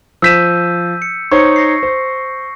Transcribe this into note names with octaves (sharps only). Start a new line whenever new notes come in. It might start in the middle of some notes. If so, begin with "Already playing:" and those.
F3 E6 G6 B6 D#7 E7
C#7
D#4 C5 C#5 C#6 C#7
A#6 C7
C5